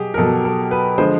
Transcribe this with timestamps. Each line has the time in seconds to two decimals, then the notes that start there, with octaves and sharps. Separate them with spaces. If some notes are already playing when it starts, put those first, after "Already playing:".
Already playing: B2 F#3 G4 G#4
0.14 A#4
0.18 B2 F#3 A4
0.45 A4
0.71 B4
0.98 D3 F3 G#3 C5